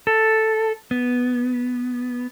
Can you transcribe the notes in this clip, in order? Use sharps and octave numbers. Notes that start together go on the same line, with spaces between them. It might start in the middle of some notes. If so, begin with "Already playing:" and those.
A4
B3